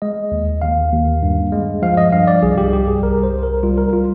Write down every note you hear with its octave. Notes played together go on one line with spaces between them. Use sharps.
G#3 D#5
D#2
D#2 F5
D#2
G2
G#3
F3 F5
D#5
G2 F5
D5
C2 G#4
G4
G3 G4
G#4
C2 A#4
C5
C2
A#4
G3 F4
A#4
G3 F4